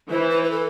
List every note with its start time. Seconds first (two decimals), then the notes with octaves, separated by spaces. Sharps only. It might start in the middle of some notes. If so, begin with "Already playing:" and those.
0.10 E3 C5
0.30 B4
0.44 B4
0.51 A4